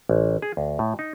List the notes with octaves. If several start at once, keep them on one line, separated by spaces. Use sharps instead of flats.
A1
G#4
D2
A2
D#4